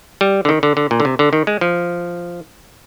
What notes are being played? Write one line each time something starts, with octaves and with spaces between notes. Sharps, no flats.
G3
D3
D#3
D3
D3
A#2
D3
C3
D3
D#3
G#3
F3